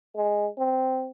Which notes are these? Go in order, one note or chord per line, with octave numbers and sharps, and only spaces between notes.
G#3
C4